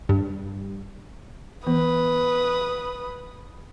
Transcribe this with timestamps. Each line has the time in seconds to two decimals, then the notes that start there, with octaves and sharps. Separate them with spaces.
0.09 G2
1.67 E3 B3 B4 D#6